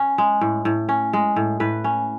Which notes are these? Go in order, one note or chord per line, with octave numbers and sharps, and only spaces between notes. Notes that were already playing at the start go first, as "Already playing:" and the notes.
Already playing: C#4
G#3
A2
A2
C#4
G#3
A2
A2 B4
C#4